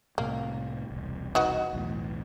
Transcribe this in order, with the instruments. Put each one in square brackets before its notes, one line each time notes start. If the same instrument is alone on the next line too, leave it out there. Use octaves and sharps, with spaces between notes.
[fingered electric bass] C2 A2 C3 [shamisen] A#3
[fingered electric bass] E1 C2
[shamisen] D#4 F#4 B4
[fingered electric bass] B1 E2 A2